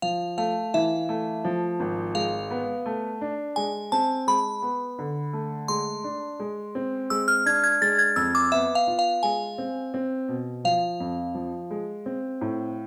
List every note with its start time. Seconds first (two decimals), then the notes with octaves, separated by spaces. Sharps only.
0.02 F3 F5
0.38 A3 F5
0.74 E3 E5
1.09 A3
1.44 F3
1.80 G#1
2.15 G#3 F5
2.51 B3
2.86 A3
3.21 D4
3.56 G#3 G#5
3.92 C4 A5
4.27 G#3 B5
4.62 B3
4.99 D3
5.33 A3
5.68 G#3 C6
6.04 D4
6.40 G#3
6.75 C4
7.10 G#3 E6
7.28 F6
7.46 D4 G#6
7.64 G#6
7.81 G#3 A6
7.99 G#6
8.16 F2 E6
8.35 D6
8.52 B3 E5
8.75 F5
8.87 F4
8.99 F5
9.23 G#3 G#5
9.58 C4
9.94 C4
10.28 B2
10.64 F3 F5
11.00 F2
11.35 F3
11.71 G#3
12.06 C4
12.41 A2